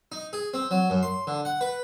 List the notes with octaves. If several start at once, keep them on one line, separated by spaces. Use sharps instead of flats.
D#4
G#4
C4
F#3
F#2
C6
D3
F#5
B4